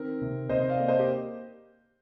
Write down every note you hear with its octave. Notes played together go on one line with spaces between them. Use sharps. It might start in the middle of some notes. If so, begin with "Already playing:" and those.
Already playing: D#3 C4 A#4
C3
C3 C5 D#5
D5 F5
A#3
C5 D#5
G4